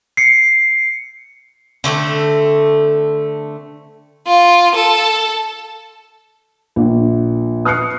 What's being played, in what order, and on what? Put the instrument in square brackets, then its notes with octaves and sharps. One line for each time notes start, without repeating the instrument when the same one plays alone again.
[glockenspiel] C7 C#7
[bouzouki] D3 A3 B3 C4
[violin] F4
A4
[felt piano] A#1
D#6 F6 F#6 C7 C#7